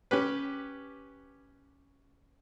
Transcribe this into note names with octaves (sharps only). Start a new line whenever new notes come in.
C#4 G4 B4